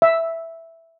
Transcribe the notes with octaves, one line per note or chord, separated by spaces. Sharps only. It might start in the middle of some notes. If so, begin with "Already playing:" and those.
E5